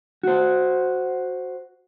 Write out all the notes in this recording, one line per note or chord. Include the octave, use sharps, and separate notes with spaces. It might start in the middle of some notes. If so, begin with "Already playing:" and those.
F#4 C5